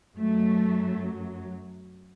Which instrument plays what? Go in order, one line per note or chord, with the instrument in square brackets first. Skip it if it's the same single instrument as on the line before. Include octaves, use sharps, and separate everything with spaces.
[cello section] F#2 F#3 A3